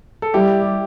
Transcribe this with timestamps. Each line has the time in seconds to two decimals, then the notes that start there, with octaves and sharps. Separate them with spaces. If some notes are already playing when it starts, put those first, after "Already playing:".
0.22 A4
0.34 G3 E4 G4